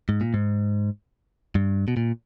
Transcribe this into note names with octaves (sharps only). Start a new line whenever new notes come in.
G#2
A#2
G#2
G2
B2
A#2